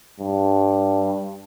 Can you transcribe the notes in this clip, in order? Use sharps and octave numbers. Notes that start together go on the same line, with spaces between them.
G2